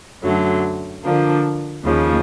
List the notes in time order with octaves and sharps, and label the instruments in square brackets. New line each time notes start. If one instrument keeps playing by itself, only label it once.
[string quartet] F#2 D3 F#3 A3
D3 F3 A#3 D4
D#2 C#3 F3